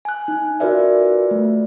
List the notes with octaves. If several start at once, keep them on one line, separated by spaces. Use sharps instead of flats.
G#5 F#6
D#4
F4 F#4 A#4 B4 D5 E5
A3